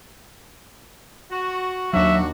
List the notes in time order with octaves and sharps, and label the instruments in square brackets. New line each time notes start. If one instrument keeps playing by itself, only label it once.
[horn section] F#4
[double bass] D#2 D4 [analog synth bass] F#3 [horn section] F#4 [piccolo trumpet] E5